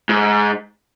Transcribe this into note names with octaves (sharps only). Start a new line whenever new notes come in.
G#2